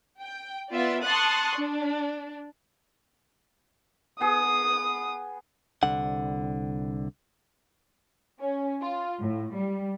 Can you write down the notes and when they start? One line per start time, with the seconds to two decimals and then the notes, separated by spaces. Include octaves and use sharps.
0.21 G5
0.72 B3 F4 D5 E5
1.03 A5 C6 C#6 D#6 F#6 A6
1.56 D4
4.21 B3 G#4 D#6
5.83 C2 D3 F#5
8.40 C#4
8.81 F4
9.21 A2
9.55 G3